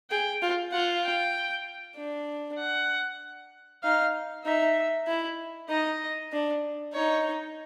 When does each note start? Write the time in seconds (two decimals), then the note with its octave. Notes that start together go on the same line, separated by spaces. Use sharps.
0.10 G#4 G5
0.42 F4
0.72 F4 F#5
1.04 G5
1.96 D4
2.58 F#5
3.83 D#4 F5
4.45 D#4 E5
5.08 E4
5.69 D#4 D#5
6.32 D4
6.94 D#4 C#5